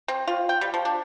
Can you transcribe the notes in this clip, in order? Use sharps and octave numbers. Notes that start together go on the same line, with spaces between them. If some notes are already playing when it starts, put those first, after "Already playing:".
C4
F4
G5
G3
F3
D4